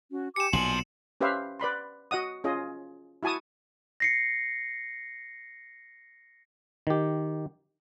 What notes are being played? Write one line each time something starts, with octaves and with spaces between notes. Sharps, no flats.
C#4 F#4
G4 G#5 D6 C#7 E7
B1 A#2 F3 G#5 F#7
C#4 G4 B4 C5 E5 F5
B4 D5 B5 C6
F#4 D#5 F#5 D#6
C#4 F4 G#4 D#5
E4 F#4 G#5 A5 D#6
A#6 C7 C#7
D#3 G4